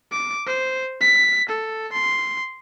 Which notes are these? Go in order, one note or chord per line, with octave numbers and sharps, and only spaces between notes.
D6
C5
B6
A4
C6